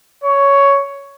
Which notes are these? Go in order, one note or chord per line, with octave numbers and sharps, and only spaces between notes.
C#5